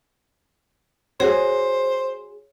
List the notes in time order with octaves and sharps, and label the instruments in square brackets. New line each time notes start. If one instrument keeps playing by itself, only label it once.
[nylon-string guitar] F#4 G#4 [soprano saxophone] C5 [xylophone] C#5